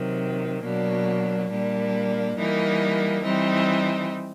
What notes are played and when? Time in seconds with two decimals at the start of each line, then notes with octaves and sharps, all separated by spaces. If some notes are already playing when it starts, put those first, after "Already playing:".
Already playing: C3 D#3 F#3
0.64 B2 F#3 A#3 D4
1.50 A#2 G3 A#3 D4
2.37 E3 G3 A#3 D#4
3.23 E3 G3 C4 D#4